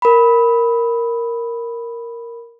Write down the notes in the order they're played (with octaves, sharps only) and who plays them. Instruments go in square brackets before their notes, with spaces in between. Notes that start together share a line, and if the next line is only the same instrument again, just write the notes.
[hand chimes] A#4 B5